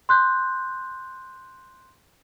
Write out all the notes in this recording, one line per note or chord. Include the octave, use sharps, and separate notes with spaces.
C6 F#6 G6